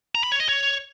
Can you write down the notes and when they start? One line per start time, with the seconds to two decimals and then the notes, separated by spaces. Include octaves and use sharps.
0.15 A#5
0.23 B5
0.32 C#5
0.40 D#5
0.49 C#5